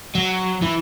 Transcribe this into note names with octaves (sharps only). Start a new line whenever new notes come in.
F#3
E3